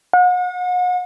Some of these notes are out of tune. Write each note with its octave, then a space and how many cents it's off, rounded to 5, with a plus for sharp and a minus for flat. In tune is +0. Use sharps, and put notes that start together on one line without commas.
F#5 -40